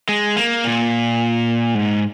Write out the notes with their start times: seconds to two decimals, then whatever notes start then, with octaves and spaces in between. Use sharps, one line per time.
0.09 G#3
0.36 A#3
0.64 A#2
1.75 G#2